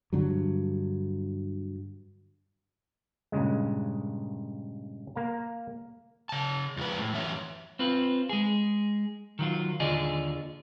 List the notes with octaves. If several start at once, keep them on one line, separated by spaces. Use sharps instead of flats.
G2 D3 F#3
G2 A#2 C#3 G#3
A#3 F5 A#5
C#3 A5
F2 G#3 B4
A2
F#2 E3 C#5 E5
C4 F4 B4
G#3 G#4
D#3 F#3 F4
D#2 D3 F4 G#4 D5 D#5